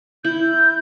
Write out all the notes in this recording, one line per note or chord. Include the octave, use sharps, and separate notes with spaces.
E4 G6